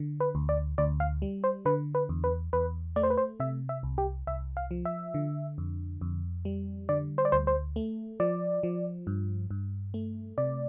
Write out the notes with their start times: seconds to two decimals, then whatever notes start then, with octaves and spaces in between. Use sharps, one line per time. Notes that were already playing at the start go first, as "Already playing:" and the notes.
Already playing: D3
0.20 B4
0.35 D2
0.49 D5
0.78 D2 D5
1.00 F5
1.22 G3
1.44 C5
1.65 D3 B4
1.95 B4
2.09 E2
2.24 B4
2.53 E2 B4
2.96 A3 D5
3.03 C5
3.10 B4
3.17 C5
3.40 C3 E5
3.69 E5
3.83 C2
3.98 G4
4.27 C2 E5
4.57 F5
4.71 F3
4.85 E5
5.14 D3
5.58 F2
6.01 F2
6.45 G3
6.89 D3 D5
7.18 C5
7.25 D5
7.32 D2 C5
7.47 C5
7.76 A3
8.20 F3 D5
8.63 F3
9.07 G2
9.51 G2
9.94 A3
10.38 C3 D5